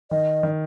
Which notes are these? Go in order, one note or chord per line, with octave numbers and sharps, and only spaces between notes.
D#3 D#5
D#3